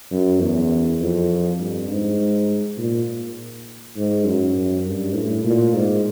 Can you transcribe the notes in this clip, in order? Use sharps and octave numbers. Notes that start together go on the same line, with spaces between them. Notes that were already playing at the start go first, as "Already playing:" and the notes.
F#2
E2
F2
G2
G#2
A#2
G#2
F#2
G2
A2
A#2
G#2